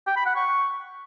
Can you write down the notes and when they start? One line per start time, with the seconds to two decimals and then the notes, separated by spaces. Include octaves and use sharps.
0.07 G5
0.16 B5
0.26 F#5
0.36 C#6